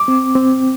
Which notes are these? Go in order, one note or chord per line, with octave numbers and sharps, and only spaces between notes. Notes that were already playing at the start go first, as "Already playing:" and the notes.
Already playing: D6
C4
C4